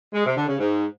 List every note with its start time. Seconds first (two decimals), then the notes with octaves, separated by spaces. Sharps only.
0.13 G#3
0.25 C3
0.36 D3
0.48 C#3
0.59 G#2